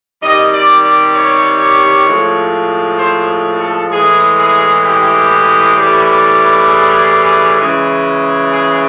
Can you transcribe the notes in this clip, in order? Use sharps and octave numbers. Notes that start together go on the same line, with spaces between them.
C3 D#3 G3 D#5
D5
D5
C#5
A2 F3 G#3
C5
A4
A2 E3 G#3 G#4
G#4
G4
A2 E3 G3
G#4
C#3 E3 G#3
G#4